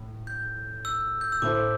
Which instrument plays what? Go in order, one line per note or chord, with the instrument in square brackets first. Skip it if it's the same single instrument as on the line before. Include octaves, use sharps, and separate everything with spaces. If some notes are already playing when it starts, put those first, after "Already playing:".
Already playing: [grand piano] A2
[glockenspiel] G6
E6
G6
E6
[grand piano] A2 A3 E4 A4 C5 [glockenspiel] D6